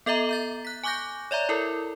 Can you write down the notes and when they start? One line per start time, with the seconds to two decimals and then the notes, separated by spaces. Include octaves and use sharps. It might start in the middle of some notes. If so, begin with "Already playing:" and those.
0.06 B3 A4 D#5 E5 A#5
0.29 A#5 G6 A6
0.65 F#6 B6
0.84 G#5 C#6 D6 F#6 G6 A#6
1.31 C#5 D5 E5 A#5
1.49 E4 A4 A#4